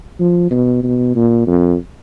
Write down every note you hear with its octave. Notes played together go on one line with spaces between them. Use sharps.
F3
B2
B2
A#2
F2